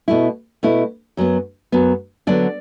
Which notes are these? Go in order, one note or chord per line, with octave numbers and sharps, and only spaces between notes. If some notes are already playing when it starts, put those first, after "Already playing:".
B2 A3 E4
B2 A3 E4
F#2 F#3 B3
F#2 F#3 B3
D3 F#3 B3 D5